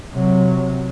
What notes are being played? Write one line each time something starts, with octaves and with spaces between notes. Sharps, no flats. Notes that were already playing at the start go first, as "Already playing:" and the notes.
C3 F#3